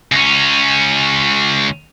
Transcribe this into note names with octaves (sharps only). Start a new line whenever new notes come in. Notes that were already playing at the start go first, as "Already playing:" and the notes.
C#2 C#4